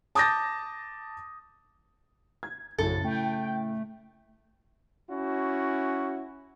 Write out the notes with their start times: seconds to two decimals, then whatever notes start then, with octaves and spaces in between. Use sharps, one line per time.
0.15 A5 D6 D#6 G6 A6 A#6
2.43 G#6
2.78 A#1 F#2 A2 C#3 A4
3.04 A3 G5
5.08 C#4 E4 F#4